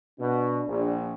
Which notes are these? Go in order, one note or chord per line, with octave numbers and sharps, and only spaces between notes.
B2 D4
A#1